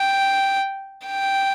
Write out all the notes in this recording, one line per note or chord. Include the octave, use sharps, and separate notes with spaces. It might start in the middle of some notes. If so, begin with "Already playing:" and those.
Already playing: G5
G5